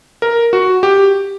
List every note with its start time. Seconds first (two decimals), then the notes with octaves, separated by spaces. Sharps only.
0.22 A#4
0.53 F#4
0.83 G4